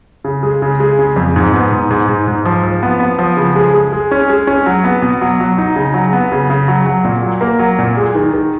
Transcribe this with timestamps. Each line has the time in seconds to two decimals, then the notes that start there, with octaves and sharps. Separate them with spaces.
0.24 C#3
0.43 G#3
0.62 C#3
0.80 G#3
0.99 C#3
1.16 F2
1.36 G#2
1.54 B3
1.72 G#2
1.91 G#2
2.09 G#2
2.27 G#2
2.45 F3
2.63 F3
2.83 B3
3.00 B3
3.19 F3
3.37 C#3
3.56 G#3
3.74 G#3
3.93 G#3
4.11 C#4
4.29 G#3
4.47 C#4
4.66 F#3
4.84 B3
5.02 B2
5.21 F#3
5.40 F#3
5.58 D#4
5.76 C#3
5.94 F#3
6.13 B3
6.32 C#3
6.50 C#3
6.68 F#3
6.86 F#3
7.05 A#2
7.23 F#3
7.41 A#3
7.59 F#3
7.79 A#2
7.97 G#3
8.15 D#3
8.34 D#3